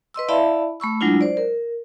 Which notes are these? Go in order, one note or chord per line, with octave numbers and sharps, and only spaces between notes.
B4 D#5 C6 E6
E4 D5 E5 F5 A5 B5
A3 B5 C#6 E6
F#3 G#3 D4 E4 F4
C5 D5
A#4